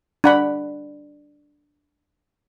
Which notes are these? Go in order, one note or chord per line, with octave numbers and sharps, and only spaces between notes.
D4 F#5 B5